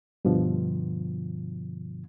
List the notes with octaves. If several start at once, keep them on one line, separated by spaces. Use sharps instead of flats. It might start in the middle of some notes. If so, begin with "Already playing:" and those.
G2 B2 D3 F3